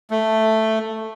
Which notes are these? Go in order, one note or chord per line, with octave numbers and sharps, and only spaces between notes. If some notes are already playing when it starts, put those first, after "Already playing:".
A3